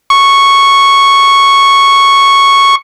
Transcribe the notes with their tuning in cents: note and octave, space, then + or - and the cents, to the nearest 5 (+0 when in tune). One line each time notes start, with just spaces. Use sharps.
C#6 -5